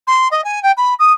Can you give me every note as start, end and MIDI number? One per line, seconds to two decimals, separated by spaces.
0.07 0.28 84
0.31 0.44 75
0.44 0.62 80
0.63 0.72 79
0.77 0.94 83
0.99 1.13 87